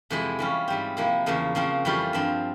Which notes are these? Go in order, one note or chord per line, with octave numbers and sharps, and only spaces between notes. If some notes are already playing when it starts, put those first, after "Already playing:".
F2 C3 E3 G#3 E4
E3 G3 C#4 F4
G#2 G3 C4
C3 F3 A#3 E4
E2 C#3 F3 A#3
C#3 F3 C4 F4
F2 E3 G3 C#4 F4
G2 F3 C4